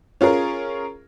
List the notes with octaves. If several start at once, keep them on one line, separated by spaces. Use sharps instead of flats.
C#4 F4 G#4 A#4